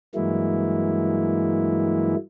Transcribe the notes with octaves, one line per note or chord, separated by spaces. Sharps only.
G2 E3 F#3 G#3 A#3 E4